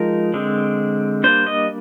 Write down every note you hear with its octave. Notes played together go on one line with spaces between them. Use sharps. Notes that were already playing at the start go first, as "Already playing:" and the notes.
Already playing: F3 G#3 D#4 A#4
D3 G#3 C4
G3 A#3 D4 C5
D#5